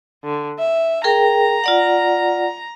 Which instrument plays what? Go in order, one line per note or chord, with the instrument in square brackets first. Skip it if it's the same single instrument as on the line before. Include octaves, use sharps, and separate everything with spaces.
[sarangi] D3
E5
[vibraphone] G#4 A#4 G5 [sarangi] A#5
[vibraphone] F4 D5 F#5